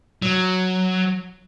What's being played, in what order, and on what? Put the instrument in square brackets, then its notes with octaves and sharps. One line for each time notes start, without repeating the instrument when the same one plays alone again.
[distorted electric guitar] F#3